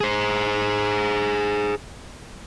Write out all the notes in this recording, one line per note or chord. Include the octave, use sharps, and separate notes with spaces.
G#4 C5